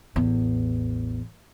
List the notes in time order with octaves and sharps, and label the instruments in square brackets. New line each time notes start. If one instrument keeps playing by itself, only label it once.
[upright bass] A1 E2